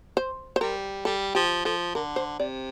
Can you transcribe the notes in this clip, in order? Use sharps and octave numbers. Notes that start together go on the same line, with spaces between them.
C5
C5
G3 A#4
G3 A4
F3 G4
F3 A4
D3 A#4
C5
C3 D5